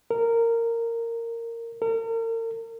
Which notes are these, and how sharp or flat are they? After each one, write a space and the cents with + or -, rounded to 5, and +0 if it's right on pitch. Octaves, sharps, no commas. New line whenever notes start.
A#4 -15
A#4 -40